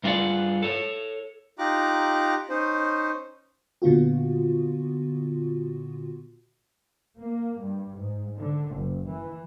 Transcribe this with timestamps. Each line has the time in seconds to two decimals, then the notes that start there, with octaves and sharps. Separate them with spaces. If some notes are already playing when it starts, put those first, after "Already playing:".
0.04 G2 D4 F4 G#4 D5 F#5
0.63 A4 C#5
1.59 D#4 F4 G4 A#5 D6 F#6
2.49 C#4 D#4 C5
3.82 A#2 D3 B3 F4 F#4
7.18 A#3
7.60 G2
7.99 G#2
8.37 D3
8.73 F#1
9.08 E3